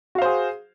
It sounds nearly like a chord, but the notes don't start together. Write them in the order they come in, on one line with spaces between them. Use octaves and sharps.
F#4 F5 C5 G#4